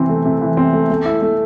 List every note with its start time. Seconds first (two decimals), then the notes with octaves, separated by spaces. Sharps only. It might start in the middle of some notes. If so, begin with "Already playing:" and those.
Already playing: C3 E3 C4
0.09 A3
0.25 C3
0.41 E3
0.57 C4
0.73 A3
0.90 A3
1.05 E4
1.22 A3